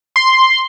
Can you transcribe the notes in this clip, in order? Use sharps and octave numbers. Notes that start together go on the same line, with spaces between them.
C6